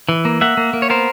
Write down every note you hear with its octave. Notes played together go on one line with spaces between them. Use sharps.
E3
A#3
A#3 E5 F#5
A#3
A#3
C#5
B3 A#4 C5